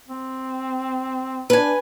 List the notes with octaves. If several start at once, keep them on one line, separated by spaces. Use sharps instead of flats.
C4
D4 B4 G#5